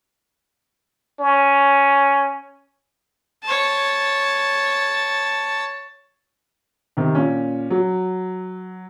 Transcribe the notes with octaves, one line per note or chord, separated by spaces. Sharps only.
C#4
C#5 A5
C3 D#3
A#2 C#4
F#3